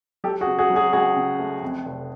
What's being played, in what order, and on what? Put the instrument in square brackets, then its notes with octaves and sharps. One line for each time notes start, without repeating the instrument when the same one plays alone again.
[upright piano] F#3 G4 A4
F#4 G#4
C#3
F#4 G#4
F#3
F#4 G#4
C#2 F#4 G#4
C#3
A3
F2
F1